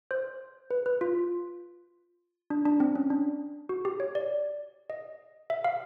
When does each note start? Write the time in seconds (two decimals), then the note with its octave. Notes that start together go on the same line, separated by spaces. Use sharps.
0.11 C5
0.71 B4
0.86 B4
1.01 F4
2.50 D4
2.66 D4
2.80 C4
2.95 C#4
3.10 D4
3.69 F#4
3.85 G4
4.00 C#5
4.15 D5
4.90 D#5
5.50 E5
5.64 F5